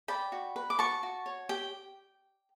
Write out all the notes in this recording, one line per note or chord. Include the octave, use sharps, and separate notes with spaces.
D5 G5 B5
F#4
B4
D6
F#4 A5 C#6
F#4
C#5
G4 G5